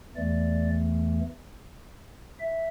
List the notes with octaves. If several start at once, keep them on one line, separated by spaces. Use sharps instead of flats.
E2 E3 A3 D5
E5